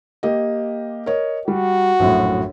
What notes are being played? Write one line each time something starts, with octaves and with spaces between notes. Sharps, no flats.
A#3 G4 D#5
A#4 C#5 D#5
G3 F#4
A#1 F#2 A2